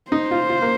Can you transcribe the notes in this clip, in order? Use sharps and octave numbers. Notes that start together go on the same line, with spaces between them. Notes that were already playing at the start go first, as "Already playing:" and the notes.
D#4 C5
F4
F4
A#3